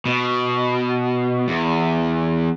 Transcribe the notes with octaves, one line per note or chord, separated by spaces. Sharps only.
B2
E2